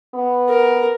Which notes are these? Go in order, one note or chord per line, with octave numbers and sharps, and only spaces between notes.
B3
A#4